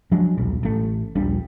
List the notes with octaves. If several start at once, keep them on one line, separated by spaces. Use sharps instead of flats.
F3 F#3 G#3 D4
D#1 B1
A1 A3
D#1 A#1 G3 D4